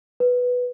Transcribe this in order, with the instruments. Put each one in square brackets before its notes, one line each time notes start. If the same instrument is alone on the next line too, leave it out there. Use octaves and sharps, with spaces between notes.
[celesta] B4